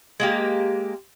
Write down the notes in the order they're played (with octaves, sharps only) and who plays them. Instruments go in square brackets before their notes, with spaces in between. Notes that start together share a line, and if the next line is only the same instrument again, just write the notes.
[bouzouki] G#3 A#3 G4